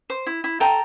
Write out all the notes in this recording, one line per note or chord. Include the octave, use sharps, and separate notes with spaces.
C5
E4
E4
A4 G5 A#5